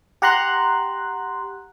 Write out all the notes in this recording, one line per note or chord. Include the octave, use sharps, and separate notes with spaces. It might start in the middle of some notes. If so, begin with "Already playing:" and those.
G4 F#5 A#5 C6 F#6